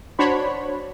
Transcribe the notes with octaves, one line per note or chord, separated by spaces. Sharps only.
D4 F#4 C5 C#5 B5